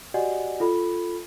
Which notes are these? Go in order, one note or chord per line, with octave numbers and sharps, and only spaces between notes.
F#4 G4 D5 D#5 F#5 G#5
F4 A4 B5